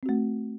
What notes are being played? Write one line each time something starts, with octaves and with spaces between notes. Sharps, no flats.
A3 C4 F#4